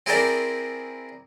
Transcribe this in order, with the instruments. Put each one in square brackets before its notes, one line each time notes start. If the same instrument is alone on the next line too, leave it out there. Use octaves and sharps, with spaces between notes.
[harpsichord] C4 E4 G#4 A#4 C5 D5